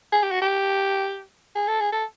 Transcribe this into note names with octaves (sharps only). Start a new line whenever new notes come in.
G#4
G4
F#4
G4
G#4
A4
G#4
A4